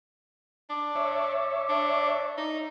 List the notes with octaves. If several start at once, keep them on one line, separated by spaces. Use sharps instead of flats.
D4 D6
C#5 E5
D4
D#4